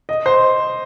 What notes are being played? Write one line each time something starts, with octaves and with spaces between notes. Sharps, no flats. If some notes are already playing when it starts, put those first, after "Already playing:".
D#5
C5